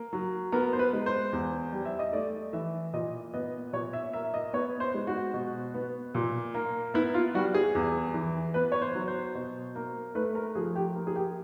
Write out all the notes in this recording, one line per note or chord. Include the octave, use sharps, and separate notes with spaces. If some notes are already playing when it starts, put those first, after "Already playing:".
Already playing: A#3
F#3
B3 A#4
C5
B4
G#3
C5
E2
G3
E5
D#5
A3 D5
E3 E5
A#2 D#5
B3 D#5
A#2 C#5
E5
A#3 E5
D#5
B3 C#5
C5
G#3
F#4
B2
B3
A#2
A#3
B3 E4
F4
G3 F#4
G#4
E2
E3
B3 B4
C#5
C5
F#3
C5
B2
A#3
A3 B4
A#4
F3 G#4
G4
A#3
G#4
G4